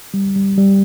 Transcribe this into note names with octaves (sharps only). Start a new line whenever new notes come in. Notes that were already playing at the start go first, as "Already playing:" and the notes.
G3
G3
G3